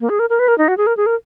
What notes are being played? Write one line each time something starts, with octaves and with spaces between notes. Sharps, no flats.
A#3
G#4
A#4
A#4
B4
A#4
D#4
F#4
G#4
A#4
G#4
A#4